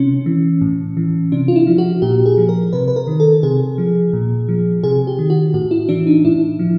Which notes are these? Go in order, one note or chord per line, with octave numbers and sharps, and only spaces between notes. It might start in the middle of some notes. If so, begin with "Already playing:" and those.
Already playing: C3 C#4
E3
A2
E3
C3 D4
F4
E4
F3
F#4
A#2 G4
G#4
F3
A#4
C3 B4
B4
A#4
D#3
A4
C3 G#4
F3
A#2
F3
C3 G#4
G4
D#3
F#4
A2 F#4
E4
E3 D4
D#4
A2 E4
F3